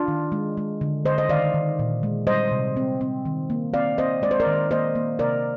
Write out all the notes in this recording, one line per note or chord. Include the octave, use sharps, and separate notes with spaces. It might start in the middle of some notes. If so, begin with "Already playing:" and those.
Already playing: D4 F4
D#3
G#3
G#3
D3
D3 C5 D#5
D#5
D#3 D5 F5
D#3
A#2
G#3
G3 C5 D#5
C3
C4
C4
D#3
A#3
C4 D5 F5
C4 C5 D#5
G#3 D5
C5
A#4 D5
D#3
A#3 C5 D#5
A#3
C3 A#4 D5